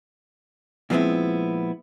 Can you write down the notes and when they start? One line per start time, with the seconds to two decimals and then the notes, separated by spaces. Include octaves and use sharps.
0.90 A#2 F3 G#3 B3 C4 E4